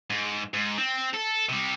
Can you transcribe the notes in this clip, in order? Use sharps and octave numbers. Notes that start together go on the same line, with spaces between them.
G#2
G#2
C4
A4
C3 G3